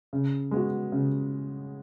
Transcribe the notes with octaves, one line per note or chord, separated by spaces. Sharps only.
C#3
G#3 B3 F#4
C#3